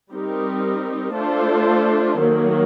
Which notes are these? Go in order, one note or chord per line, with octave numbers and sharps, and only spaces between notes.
G3 C4 D#4 G4 A#4
A3 D4 F4 A4 C5
D#3 F#3 A#3